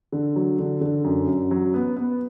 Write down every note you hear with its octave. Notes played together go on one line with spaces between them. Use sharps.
D3
F#3
D3
D3
F#2
F#2
F#3
B3
B3